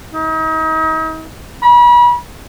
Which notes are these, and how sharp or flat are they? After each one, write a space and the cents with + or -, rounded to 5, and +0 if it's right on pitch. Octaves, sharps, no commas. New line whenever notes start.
D#4 +40
B5 -35